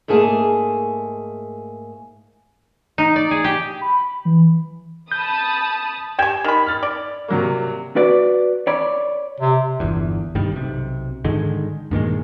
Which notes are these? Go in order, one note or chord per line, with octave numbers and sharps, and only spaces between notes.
G#2 A3 A#3 G#4 G#5 A5
D#4
D5
G#4
G4
B5
E3
A5 B5 D#6 G6
G4 G5 G#5 G#6 E7
D#3 B5
F6 A6
D5
C3 F#3 A#3
F#4 B4 D5
C#5 D5 B5
C3
G1 E2
G2 C3 D#3 G3
B1 C3
G#2 D3 D#3 G#3
G2 A#2 D#3 G#3